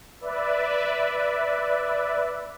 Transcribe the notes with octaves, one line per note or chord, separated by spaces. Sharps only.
B4 D5 E5